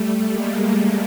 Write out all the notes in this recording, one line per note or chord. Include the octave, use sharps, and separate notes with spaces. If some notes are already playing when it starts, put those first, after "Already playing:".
Already playing: G3 A3
G#3 A#3